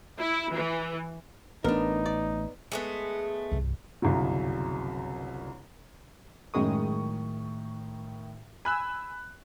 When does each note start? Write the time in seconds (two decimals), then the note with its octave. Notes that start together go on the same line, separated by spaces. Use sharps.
0.19 E4
0.54 E3
1.64 A1 B3 D4 D#4 A#4
2.06 D5
2.72 G#3 A3 B3
3.52 C2 G2
4.02 G1 C2 F#2 C#3 F#3
6.54 F#2 A2 D#3 G#3 C#6 D#6
8.65 G#5 B5 E6 F#6